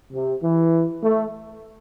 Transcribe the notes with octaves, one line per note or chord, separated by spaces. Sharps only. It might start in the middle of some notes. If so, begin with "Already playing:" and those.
C3
E3
A3